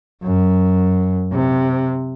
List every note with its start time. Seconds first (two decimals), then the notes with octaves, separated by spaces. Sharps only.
0.23 F#2
1.32 C3